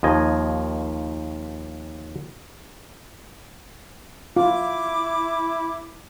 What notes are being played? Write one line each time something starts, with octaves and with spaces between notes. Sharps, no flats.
D#2 F3 D#5 G#5
E4 F4 D6